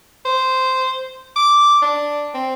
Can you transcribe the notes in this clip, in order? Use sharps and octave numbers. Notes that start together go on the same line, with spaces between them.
C5
D6
D4
C4